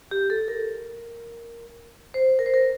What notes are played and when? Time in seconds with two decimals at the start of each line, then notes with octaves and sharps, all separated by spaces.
0.11 G4
0.30 A4
0.48 A#4
2.14 C5
2.39 A#4
2.46 C5
2.54 A#4